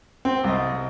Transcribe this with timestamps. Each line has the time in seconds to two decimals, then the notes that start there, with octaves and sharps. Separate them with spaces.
0.25 C4
0.44 C2 D#5